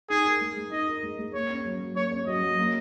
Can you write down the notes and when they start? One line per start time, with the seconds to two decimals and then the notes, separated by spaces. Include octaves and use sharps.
0.10 D#4 G#4
0.25 A#4
0.41 G#3
0.57 G#3
0.72 D#4 D#5
0.87 A#4
1.03 G#3
1.19 G#3
1.34 A#3 C#5
1.50 C#4
1.65 F#3
1.80 F#3
1.96 A#3 C#5
2.12 C#4
2.27 F#3 D#5
2.43 F#3
2.58 A#3